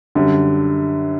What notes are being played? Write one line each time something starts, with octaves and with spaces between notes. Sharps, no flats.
F#2 D3 G3